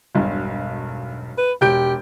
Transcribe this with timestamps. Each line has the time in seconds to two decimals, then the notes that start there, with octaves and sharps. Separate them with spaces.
0.15 E1 B1 G2
1.38 B4
1.61 E1 G4 G6 D7